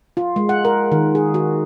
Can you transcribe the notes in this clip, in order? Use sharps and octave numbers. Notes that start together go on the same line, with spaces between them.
F4
G#3
F#5
A#4
D#3
G#4
F#4